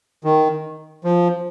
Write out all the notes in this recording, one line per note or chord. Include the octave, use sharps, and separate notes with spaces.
D#3
F3